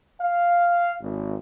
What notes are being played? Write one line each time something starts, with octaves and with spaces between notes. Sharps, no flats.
F5
G#1